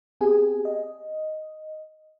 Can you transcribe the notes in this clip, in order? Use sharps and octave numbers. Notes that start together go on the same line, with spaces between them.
B3 C4 G4 G#4 G#5
D#5